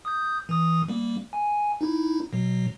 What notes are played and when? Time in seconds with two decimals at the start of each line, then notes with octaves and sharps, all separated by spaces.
0.05 D#6 G6
0.49 E3 D#6
0.88 G3 A#3
1.33 G#5
1.81 D#4 E4
2.33 B2 F#3